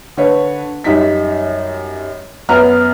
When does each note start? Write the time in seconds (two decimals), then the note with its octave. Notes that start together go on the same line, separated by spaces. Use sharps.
0.17 D3 B4 C#5
0.84 F#2 G3 D#4 B6
2.49 F#2 B3 B4 A#5 F6